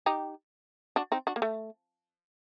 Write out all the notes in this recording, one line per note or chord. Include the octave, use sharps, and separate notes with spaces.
D#4 G4
D4 F#4
C4 D#4
D4 F#4
A#3
A3